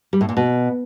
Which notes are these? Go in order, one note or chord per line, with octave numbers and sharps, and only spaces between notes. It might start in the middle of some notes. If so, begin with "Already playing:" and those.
G3
A2
A#2
B2